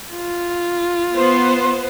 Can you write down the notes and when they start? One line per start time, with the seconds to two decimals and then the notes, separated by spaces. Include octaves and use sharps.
0.13 F4
1.15 B3 C5 C6